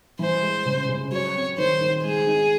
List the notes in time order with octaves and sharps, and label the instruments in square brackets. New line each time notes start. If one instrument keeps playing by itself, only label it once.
[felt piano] E3 [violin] C5
[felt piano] G#3
C#3
C#3
[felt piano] F#3 [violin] C#5
[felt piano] C4
[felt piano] D#3 [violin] C5
[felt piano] D#3
[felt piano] G#3 [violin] G#4
[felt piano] D#4